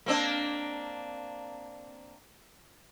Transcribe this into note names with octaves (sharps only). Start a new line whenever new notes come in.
A#3 C4 D4